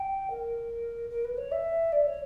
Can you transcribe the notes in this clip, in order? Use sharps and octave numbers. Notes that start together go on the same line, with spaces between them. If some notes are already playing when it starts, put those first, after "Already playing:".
Already playing: G5
A#4
A#4
B4
C#5
E5
D5
C#5